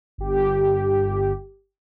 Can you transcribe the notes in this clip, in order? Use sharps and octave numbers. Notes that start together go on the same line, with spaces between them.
G1 G4